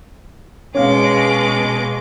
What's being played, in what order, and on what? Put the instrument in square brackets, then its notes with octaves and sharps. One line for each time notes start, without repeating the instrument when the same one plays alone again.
[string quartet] B2 G#3 D6 [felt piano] C#4 F5